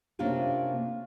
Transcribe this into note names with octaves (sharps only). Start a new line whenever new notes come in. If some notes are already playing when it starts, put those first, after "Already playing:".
C3 A#3 C#4 D4 F4 G4